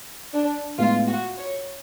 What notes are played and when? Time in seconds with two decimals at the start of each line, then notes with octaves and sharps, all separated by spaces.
0.34 D4
0.78 A2 G#3 B3 F4
1.08 F#4
1.38 C#5